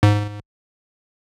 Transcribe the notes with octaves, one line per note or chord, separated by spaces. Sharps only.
G#2